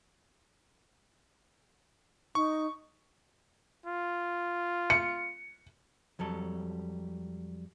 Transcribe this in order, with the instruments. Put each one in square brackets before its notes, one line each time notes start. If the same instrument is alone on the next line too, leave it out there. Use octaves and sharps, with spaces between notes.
[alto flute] D#4 [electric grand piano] C#6
[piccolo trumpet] F4
[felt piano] C#7
[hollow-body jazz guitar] F2 F#3 G3 A4